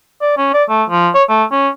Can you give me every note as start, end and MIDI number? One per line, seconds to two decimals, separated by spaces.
0.22 0.33 74
0.38 0.52 61
0.54 0.63 74
0.69 0.83 57
0.90 1.09 53
1.14 1.23 73
1.29 1.44 57
1.51 1.69 61